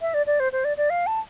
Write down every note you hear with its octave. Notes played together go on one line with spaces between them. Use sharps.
E5
D5
D5
C5
C5
D5
D5
F5
A5